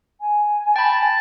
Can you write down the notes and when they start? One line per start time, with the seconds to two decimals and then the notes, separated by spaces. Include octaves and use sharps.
0.20 G#5
0.76 G5 A5 B5